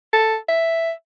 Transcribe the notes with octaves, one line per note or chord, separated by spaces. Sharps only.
A4
E5